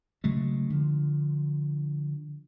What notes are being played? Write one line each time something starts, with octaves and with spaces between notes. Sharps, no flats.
C#3 F#3 G#3 A3
D3 F3